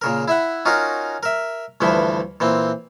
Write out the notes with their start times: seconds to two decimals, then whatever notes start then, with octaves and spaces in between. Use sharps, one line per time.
0.02 A#2 C#3 A#4
0.28 E4 E5 F#5
0.65 C#4 D#4 F4 F#4 A#4
1.23 A#4 E5
1.81 D2 G2 E3 F3 E5
2.40 A#2 E3 C4